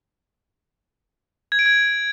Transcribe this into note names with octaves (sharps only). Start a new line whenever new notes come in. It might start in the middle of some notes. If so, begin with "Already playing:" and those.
G#6
D7
G#6